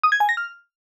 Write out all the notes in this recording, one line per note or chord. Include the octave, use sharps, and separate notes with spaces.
D#6
G#6
G#5
A#6
F6